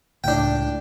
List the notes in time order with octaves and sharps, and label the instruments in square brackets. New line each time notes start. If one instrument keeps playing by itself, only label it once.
[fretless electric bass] C#2 A2 [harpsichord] D4 G5